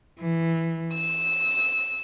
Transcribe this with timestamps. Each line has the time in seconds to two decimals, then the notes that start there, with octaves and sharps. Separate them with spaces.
0.19 E3
0.96 E6